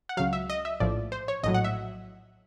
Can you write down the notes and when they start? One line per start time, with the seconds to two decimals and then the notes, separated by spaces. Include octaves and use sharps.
0.09 F#5
0.17 C#2 C#3 F#3 F5
0.33 E5
0.50 D#5
0.65 E5
0.80 A#1 A2 F3 D5
1.12 C5
1.28 C#5
1.43 A#1 A2 F#3 D#5
1.54 F#5
1.64 E5